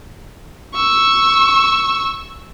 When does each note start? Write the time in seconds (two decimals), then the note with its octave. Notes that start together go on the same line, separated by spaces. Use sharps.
0.75 C#6 E6